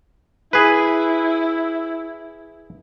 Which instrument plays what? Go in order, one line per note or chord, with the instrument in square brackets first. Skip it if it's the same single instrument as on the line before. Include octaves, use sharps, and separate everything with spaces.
[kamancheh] E4 [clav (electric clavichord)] G#4 B4